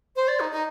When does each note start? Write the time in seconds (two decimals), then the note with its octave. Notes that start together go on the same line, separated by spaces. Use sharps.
0.16 C5
0.28 D5
0.40 D#4
0.52 D#4